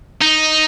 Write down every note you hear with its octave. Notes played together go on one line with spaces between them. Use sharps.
D#4